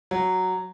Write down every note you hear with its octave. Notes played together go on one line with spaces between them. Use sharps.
F#3